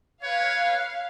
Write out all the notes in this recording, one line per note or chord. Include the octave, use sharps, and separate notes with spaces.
B4 C#5 F5